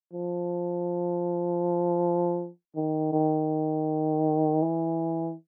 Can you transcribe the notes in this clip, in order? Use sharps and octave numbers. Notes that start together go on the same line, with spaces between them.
F3
D#3
D#3
E3